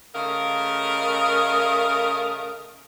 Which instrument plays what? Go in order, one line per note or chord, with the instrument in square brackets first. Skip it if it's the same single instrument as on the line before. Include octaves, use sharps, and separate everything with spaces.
[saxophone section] C#3 A3 A#4 D#5 F5